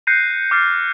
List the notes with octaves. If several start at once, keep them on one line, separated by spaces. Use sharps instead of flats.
F#6 G6 A#6 C7 C#7 D#7
D6 F6 A6 C7